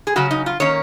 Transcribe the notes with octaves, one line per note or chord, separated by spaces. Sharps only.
G#4
C#3 F#3 C#4 F#4
D#4
F4
D#3 A#3 C#4 C#5